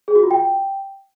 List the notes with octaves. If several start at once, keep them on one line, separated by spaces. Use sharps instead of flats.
G#4
F#4
F4
G5